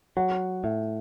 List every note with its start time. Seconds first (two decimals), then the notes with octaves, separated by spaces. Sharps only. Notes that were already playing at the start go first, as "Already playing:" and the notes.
0.17 F#3 F#5
0.64 A2 E5